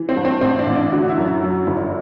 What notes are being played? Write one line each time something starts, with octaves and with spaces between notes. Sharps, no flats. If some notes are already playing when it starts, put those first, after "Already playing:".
Already playing: E3
C4
G2
C4
A1 C4
D4
A1
D4
D3 F#4
E4
F#2
E4
F#3
G1